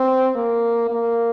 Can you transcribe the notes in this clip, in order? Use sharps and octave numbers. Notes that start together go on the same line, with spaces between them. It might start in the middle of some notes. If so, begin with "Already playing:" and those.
Already playing: C4
A#3
A#3